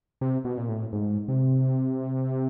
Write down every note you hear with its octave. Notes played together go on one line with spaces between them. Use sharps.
C3
B2
A#2
A2
G#2
C3